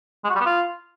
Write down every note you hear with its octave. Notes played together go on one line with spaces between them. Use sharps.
G#3
F#4
G3
B3
F4